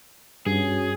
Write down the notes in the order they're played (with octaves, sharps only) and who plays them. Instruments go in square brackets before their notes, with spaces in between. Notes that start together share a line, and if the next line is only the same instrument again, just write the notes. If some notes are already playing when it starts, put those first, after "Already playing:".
[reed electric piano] G2 [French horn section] C#4 F#4 [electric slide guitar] G#4